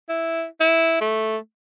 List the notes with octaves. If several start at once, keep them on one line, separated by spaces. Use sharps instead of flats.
E4
E4
A3